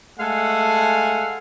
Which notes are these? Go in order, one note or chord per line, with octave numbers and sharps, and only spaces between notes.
G#3 A3 A4 F5 F#5 G#5